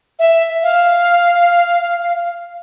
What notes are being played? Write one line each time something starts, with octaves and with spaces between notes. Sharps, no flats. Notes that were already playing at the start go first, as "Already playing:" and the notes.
E5
F5